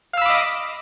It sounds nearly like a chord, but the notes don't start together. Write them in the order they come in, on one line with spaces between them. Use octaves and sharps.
F5 E6 B5 D6 D#5